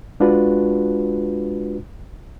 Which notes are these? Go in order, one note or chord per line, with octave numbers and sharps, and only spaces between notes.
G#3 D4 F4 F#4 B4